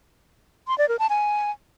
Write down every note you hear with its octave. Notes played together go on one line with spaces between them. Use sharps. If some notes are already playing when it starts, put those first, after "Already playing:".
C6
D5
A#4
A5
G#5